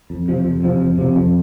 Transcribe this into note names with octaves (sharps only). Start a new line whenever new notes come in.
F2
C3 F3
F2
C3 F3
F2
C3 F3
F2